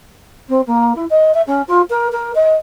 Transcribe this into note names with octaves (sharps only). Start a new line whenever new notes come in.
C4
A#3
E4
D#5
E5
C#4
F4
A#4
A#4
D#5